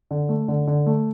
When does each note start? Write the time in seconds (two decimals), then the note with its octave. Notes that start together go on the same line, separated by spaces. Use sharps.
0.11 D3
0.29 A3
0.48 D3
0.67 D3
0.86 A3